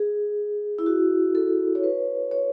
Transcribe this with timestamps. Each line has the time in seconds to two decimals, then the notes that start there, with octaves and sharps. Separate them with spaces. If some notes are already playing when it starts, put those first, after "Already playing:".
Already playing: G#4
0.79 E4
0.86 F#4
1.35 A4
1.75 C#5
1.84 B4
2.31 C#5